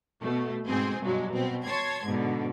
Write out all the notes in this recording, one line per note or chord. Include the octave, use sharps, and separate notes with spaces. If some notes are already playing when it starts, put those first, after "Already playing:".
B2 A3
G#2 B2 C4 G#4
G2 B2 F#3 G#3
B2 C4
C#5 A5 C6 G#6
G#2 B2 D3